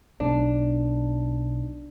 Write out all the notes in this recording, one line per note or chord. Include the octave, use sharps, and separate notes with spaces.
B1 D4